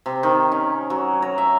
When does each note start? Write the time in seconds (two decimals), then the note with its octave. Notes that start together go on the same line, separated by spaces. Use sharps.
0.06 C3
0.23 D#3
0.52 C#4
0.90 F#3
1.22 A#5
1.38 E5